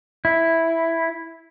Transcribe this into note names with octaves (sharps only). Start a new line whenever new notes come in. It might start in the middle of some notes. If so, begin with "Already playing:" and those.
E4